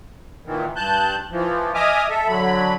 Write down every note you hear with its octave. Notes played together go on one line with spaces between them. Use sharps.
A#2 D#3 E3
G2 A5 F#6 G6
E3 F3
D#5 E5 G#5 D6 D#6 F6
A4 E5
D3 F#3 B5